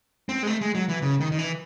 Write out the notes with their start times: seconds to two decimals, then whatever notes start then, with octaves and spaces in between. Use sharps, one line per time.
0.29 C4
0.43 G#3
0.47 A3
0.61 G#3
0.75 F#3
0.89 E3
1.02 C#3
1.20 D#3
1.32 D#3
1.39 E3